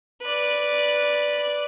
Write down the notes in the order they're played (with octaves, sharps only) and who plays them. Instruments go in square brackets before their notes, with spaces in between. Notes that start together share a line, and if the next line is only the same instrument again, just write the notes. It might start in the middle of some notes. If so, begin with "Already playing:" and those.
[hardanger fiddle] B4 D5